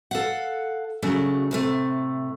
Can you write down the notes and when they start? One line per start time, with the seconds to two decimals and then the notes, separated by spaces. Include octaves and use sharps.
0.11 A4 F5 F#5
1.02 C#3 F#3 A3 D4
1.51 A2 C3 A3